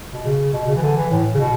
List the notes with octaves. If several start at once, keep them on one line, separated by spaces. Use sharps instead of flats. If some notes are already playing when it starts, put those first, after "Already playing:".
B2
C#3
B2
C#3
E3
D3
E3
A2
C#3
B2